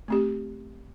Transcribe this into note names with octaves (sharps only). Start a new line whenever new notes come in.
A3 C4 G4